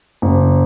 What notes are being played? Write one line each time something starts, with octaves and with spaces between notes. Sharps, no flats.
F#1